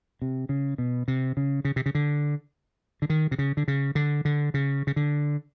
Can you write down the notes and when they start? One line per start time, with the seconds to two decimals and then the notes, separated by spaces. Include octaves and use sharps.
0.22 C3
0.49 C#3
0.78 B2
1.08 C3
1.37 C#3
1.65 C#3
1.76 C3
1.86 C#3
1.95 D3
3.02 D3
3.10 D#3
3.31 C3
3.39 C#3
3.57 D3
3.68 C#3
3.95 D3
4.25 D3
4.54 C#3
4.87 C#3
4.96 D3